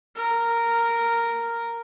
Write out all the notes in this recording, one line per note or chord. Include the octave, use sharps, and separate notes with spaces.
A#4